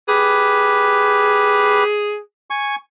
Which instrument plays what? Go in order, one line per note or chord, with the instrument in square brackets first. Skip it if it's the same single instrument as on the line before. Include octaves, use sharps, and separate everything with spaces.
[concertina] G4 B4 [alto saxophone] G#4
[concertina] G#5 C#6